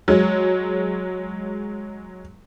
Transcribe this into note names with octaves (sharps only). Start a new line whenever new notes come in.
F#3 G#3